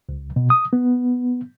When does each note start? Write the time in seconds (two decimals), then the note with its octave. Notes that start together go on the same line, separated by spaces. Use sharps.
0.09 C#2
0.36 B2
0.50 D#6
0.73 B3